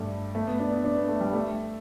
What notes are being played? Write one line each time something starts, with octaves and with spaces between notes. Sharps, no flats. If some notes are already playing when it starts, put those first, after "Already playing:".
Already playing: G2 G3 A3
A3
B3
D4
B3
D4
B3
A3
G3
A3